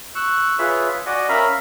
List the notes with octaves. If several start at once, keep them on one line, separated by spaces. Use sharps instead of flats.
C#6 E6 F#6
F4 G#4 B4 C#5 E5
F#4 D5 D#5 F#5 G#5
C#4 A#4 E5 F5 A#5 B5